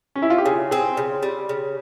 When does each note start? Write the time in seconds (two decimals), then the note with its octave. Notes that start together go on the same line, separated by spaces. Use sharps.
0.15 C#4
0.22 E4
0.30 F4
0.38 G4
0.45 C#3 G#4
0.71 C4 G#4
0.97 C#3
1.23 G3
1.49 C#3